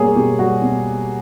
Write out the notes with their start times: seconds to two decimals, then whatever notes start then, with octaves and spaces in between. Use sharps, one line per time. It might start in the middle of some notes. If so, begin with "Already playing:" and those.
Already playing: B2 G3 A#3 G#4 C#5
0.16 B2 G4
0.39 G3 F#4
0.62 B2